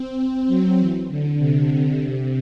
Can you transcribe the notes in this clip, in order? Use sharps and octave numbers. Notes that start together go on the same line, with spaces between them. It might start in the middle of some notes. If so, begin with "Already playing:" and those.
Already playing: C4
F#3
E3
D3
C3
C3
C3